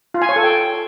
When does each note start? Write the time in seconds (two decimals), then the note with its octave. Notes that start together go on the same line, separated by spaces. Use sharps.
0.14 F4
0.22 G#5
0.29 C#5
0.36 A4
0.43 G5